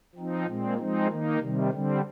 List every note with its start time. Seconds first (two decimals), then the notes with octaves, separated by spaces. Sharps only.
0.15 F3 C4 D#4
0.46 A#2 G#3 C4
0.78 F3 G#3 C4 D#4
1.09 D#3 A#3 D#4
1.39 C3 D#3 G3
1.70 D3 G3 C4